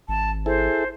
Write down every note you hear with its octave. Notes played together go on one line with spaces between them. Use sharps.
G#1 A5
E4 G#4 A4 C5